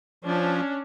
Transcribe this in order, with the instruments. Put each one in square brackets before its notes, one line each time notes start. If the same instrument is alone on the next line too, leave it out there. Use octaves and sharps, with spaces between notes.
[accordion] F3 [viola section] C#4 D4